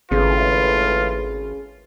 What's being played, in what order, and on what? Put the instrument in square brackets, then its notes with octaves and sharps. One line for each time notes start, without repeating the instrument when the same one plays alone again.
[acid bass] G#1 [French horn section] A2 G#3 B4 [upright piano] C#3 [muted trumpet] F4